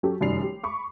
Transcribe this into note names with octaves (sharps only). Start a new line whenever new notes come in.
F#3 C#4 G4 A4
F1 F#2 D#3 G3 C7 F7
G4
B5 C#6 D6